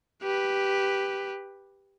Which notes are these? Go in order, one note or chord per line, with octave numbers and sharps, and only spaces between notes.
G4 B4